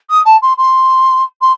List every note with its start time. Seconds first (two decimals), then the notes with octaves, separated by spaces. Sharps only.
0.09 D#6
0.25 A5
0.42 C6
0.57 C6
1.41 C6